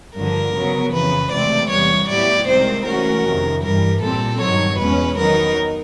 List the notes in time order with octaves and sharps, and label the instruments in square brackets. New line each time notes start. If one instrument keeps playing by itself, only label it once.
[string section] G2 D3 F3 [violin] A#4
[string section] C#3 F#3 B3
[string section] F2 C#3 E3 [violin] B4
[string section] C#2 C3 E3 A3 C4 [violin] D5
[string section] E2 C3 E3 G3 B3 [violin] C#5
[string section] A2 F#3 B3 E4 G4 [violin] D5
[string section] C2 C3 D#3 G#3 C4 [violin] C5
[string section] E3 A3 C#4 F#4 [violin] A#4
[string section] F2 C3 D#3
[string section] G2 E3 G3 [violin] A#4
[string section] A#2 G3 C4 [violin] A4
[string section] G2 D#3 F#3 [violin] C#5
[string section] E2 B2 G#3 C#4 [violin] B4
[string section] D#3 F#3 B3 D#4 [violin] A#4